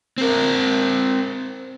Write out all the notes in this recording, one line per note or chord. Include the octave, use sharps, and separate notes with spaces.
C4 A#4